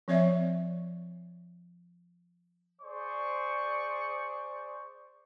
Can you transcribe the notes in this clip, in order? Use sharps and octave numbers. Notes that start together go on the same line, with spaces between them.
F3 C4 C#5 D5 E5
G#4 C5 D5 C#6